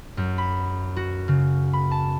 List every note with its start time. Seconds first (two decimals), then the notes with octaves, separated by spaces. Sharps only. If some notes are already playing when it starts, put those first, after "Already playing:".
0.17 F#2
0.38 B5
0.96 F#4
1.28 C#3
1.73 B5
1.91 A5